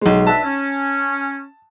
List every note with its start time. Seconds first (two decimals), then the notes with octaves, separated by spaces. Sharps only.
0.01 B1 G#3
0.27 D4 B4 E5 A5
0.45 C#4